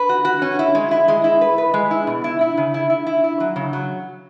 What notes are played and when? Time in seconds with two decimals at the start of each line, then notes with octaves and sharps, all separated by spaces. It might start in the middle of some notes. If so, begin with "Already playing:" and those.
Already playing: B4
0.09 F#4
0.25 F#4
0.42 C#4
0.59 E4
0.75 G#3
0.91 E4
1.08 G#3
1.24 E4
1.41 B4
1.58 B4
1.74 G#3
1.91 E4
2.07 B2
2.24 E4
2.41 E4
2.57 C#3
2.74 E4
2.90 E4
3.07 E4
3.24 E4
3.40 F#3
3.56 C#3
3.73 F#3